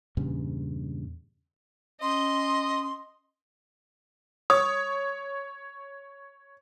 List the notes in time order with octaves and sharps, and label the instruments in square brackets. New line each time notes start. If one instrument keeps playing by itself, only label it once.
[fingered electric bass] E2 G2 A#2 C#3
[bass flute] C#4 [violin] D#5 [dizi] C6
[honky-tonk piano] C#5 [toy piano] D#6